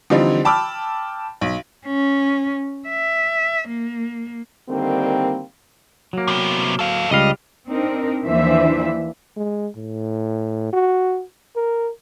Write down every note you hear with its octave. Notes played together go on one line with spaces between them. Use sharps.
D3 E3 F3 G3 C4 D#4
G5 A5 B5 D6 E6 F6
B1
C#4
E5
A#3
D3 D#3 G3 A#3 C4
F#3 A#3
C3 B3
A4 F5
C#2 G3 D#5 F5
C4 D4 D#4 A#4
D#2 E3 F3 D4 C5 E5
G#3
A2
F#4
A#4